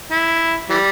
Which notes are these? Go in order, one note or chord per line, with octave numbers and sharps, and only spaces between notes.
E4
E3 G3